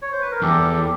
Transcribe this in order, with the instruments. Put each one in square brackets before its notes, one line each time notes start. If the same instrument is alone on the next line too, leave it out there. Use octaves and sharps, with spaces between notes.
[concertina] C#5
C5
B4
A#4
[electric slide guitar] E2 [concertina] G4 A4